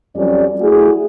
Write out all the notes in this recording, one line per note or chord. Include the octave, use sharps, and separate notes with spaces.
F2 F#3 G3 C#4 D5
A3 E4 F#4 G#4